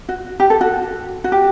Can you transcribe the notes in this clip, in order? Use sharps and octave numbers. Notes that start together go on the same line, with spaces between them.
F#4
G4
A4
F#4
F#4
G4